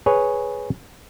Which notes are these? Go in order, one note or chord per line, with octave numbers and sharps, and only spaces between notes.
G#4 B4 C#5